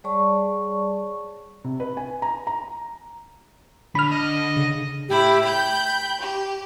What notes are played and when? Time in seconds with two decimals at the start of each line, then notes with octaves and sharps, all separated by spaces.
0.04 G3 G#4 C#5 D5 A5 C#6
1.64 C3
1.80 B4
1.97 G#5
2.22 A#5
2.47 A#5
3.95 D3 B5 F6
4.11 D#5
4.56 C#3
5.09 A2 E4 G4 B5
5.44 G5 B5 G6
6.22 G4